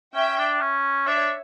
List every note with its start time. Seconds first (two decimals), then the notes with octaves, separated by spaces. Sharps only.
0.14 C#4 E5 G5
0.38 D4
0.61 C#4
1.07 D4 C#5 E5